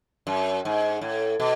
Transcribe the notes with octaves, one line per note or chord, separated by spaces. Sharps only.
F#2
G#2
A2
B2